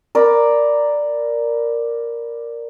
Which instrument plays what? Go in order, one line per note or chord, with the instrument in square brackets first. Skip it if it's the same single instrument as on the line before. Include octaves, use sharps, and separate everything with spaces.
[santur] A#4 D5 B5